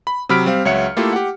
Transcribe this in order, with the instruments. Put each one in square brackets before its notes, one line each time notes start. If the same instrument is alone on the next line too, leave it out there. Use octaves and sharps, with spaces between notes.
[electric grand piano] B5
C3 F#3 B5 F6 B6 D7
G3 C4 F5
C#2 F#3 C#5 E5 F#5 C#7
A3 A#3 E4 F4 G4 A4
G4 F#5